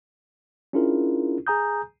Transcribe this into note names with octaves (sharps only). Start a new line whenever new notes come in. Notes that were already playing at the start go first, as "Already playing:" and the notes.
C#4 D4 E4 F4 G#4 A#4
G#4 G#5 A#5 D#6 G6